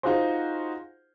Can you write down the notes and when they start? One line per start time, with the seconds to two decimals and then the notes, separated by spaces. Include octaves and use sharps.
0.03 D#4 F4 F#4 G#4 C5